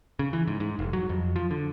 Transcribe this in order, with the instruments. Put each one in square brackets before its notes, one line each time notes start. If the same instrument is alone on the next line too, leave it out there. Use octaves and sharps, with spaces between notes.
[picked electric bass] C#3
E3
G#2
G#2
F1
F#3
F2
F3
D3